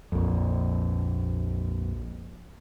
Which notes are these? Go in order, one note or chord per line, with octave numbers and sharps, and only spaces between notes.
A#1 F2